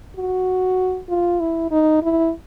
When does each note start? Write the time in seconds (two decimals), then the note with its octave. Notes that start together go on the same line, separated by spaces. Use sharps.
0.16 F#4
1.09 F4
1.40 E4
1.71 D#4
2.02 E4